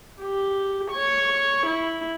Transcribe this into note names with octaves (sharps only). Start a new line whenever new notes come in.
G4
C#5 C#6
E4